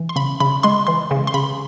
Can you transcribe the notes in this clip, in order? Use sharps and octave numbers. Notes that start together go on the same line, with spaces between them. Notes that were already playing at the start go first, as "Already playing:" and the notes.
Already playing: E3
C6
C#3 B5
C#3 B5
G#3 C6
E3 C6
C#3
C6
C#3 B5